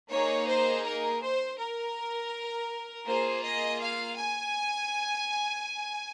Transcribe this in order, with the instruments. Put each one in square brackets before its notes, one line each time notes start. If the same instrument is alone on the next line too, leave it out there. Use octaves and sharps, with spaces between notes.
[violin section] A#3 D#4 G#4 C#5
C5
A#4
C5
A#4
A#3 F4 G#4 C5
D#5
F5
G#5